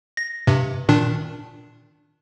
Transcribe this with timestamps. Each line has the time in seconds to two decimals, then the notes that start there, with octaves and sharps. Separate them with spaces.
0.17 A#6
0.47 G2 C3
0.89 A#2 D#3 D4